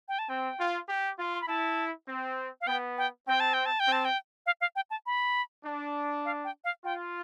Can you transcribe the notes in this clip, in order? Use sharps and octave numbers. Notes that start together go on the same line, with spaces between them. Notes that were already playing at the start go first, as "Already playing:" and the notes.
G5
A5
C4 G5
F4
G4
F4
C6
B5
E4 A5
C4
F5
B3 G5
G5
C4 G5
A5
G5
A5
G5
C4
A5
G5
F5
F5
G5
A5
B5
D4
F5
G5
F5
F4 G5